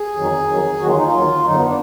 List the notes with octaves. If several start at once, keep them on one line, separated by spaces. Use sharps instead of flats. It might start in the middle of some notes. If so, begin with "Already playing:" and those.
Already playing: G#4
F2 D#3 F#3
F2 D#3 F#3
D#2 D#3 F#3 F#4
F4
D#4
F4
D#2 D#3 F#3
F#2 D3 F#3 D#4
B3
D4